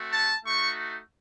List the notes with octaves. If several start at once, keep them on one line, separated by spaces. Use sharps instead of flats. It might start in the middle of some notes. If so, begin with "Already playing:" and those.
Already playing: A3 C4 F#4
A5
A3 D#4 F#4 C#6